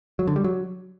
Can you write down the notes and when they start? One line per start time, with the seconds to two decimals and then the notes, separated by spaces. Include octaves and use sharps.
0.19 F#3
0.28 D3
0.36 G3
0.44 F#3